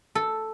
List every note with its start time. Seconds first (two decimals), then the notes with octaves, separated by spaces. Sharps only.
0.15 A4